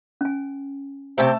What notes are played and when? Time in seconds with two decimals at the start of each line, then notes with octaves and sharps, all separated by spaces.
0.21 C#4 G#5
1.18 C3 A3 C4 G4 A5